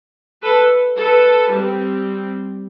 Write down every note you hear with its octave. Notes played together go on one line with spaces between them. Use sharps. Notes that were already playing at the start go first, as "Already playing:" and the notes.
A4 B4
A4 B4
G3 C4